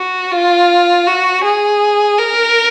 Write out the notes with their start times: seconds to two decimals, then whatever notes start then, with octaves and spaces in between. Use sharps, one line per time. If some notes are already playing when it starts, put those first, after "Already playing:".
Already playing: F#4
0.32 F4
1.07 F#4
1.44 G#4
2.18 A#4